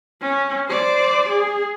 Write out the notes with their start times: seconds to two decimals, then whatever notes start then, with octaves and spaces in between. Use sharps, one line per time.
0.22 C#4
0.69 C5 D5
1.30 G#4